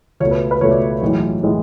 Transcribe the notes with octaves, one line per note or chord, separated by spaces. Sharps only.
C#2 B2 A3 C#5
B4
B4
C#2 B2 A3 C#5
D5
B1 A2 E3 G#3
A2 E3 G#3